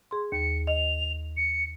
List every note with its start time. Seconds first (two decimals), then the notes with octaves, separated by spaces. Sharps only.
0.11 G#4 C6
0.32 D#2 C#7
0.67 D#5 F7
1.37 C#7